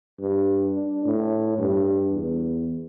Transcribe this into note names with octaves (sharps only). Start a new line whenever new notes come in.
G2
D4
A2
G2
E2